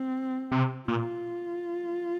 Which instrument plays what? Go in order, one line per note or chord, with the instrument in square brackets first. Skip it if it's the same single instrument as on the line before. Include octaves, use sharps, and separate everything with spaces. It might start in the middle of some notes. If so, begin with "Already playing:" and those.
Already playing: [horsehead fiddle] C4
[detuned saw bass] C3
[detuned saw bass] A#2 [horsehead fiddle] F4